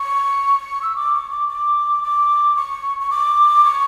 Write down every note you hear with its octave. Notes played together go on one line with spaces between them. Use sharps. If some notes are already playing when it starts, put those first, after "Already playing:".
Already playing: C#6
E6
D6
C#6
D6
D6
D6
C#6
C#6
D6
C#6